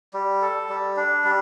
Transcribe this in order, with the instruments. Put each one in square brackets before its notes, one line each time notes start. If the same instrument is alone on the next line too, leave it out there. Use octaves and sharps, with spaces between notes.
[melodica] G3
A4
G3
D4
G3